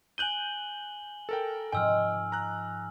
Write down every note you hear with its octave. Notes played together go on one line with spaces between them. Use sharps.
G#5 F#6 G6 D#7 F#7 G7
A4 A#4 G5
G#2 F3 G5 G#5 E6 F6
A#5 F#6